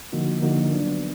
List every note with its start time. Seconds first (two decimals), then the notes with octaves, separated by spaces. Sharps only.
0.13 D3 F3 A#3 D#4 F#4
0.42 D3 F3 A#3 D#4 F#4
0.72 F#3 B3 D4